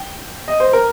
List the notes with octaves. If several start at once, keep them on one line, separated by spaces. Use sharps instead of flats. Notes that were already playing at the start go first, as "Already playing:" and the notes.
Already playing: G5
D#5
C5
A#4